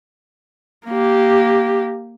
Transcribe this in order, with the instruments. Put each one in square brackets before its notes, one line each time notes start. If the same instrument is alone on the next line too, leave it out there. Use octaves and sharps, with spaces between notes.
[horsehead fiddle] A#3 G4